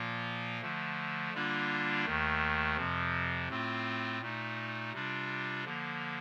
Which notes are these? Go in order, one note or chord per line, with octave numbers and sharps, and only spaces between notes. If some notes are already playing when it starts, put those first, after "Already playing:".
Already playing: A#2 F3 A#3 F4
D3 F3 A3
D3 G3 A#3 D4 F4
D#2 D#3 A3
F2 C3 F3
A2 A3 C4 F4
A#2 A3 D#4
C3 G3 D4 F4
D3 F3 A#3